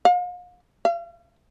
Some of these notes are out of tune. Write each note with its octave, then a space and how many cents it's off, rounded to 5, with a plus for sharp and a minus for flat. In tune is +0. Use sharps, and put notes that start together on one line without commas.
F5 +40
F5 -40